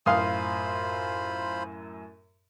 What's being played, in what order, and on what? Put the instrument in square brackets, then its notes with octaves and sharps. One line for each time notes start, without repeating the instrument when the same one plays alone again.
[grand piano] F#2 A2 [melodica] F4 C5 B5 [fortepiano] F5 C6 D#6